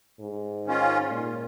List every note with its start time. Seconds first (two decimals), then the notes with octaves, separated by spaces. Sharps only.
0.20 G#2
0.65 D#3 C#4 F4
1.11 A#2